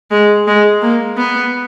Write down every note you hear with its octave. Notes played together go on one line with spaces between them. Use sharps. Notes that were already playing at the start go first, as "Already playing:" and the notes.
G#3
G#3
A#3
B3